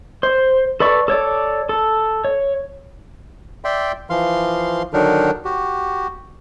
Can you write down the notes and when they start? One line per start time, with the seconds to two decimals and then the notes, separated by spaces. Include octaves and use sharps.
0.23 C5
0.80 A4 B4 D5 C#6
1.08 A4 C#5 D5
1.69 A4
2.25 C#5
3.64 D5 E5 G5 C6
4.10 E3 F3 F5 C6
4.93 D3 D#3 F#3 D4 D#4 A#4
5.45 F#4 G4